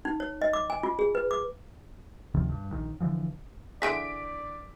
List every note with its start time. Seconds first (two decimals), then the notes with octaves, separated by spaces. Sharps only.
0.05 D#4
0.20 C#5
0.42 D#5
0.53 D6
0.70 G#5
0.83 F4
0.99 G#4
1.15 B4
1.31 D6
2.34 D2 C3 D#3 F3
2.50 G2
2.72 A#1 D#3
3.00 D3 E3 F3
3.82 D3 E3 G#4 D5 B6 D7